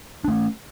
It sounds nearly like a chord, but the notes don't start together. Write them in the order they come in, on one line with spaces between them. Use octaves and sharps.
D4 A3 C#4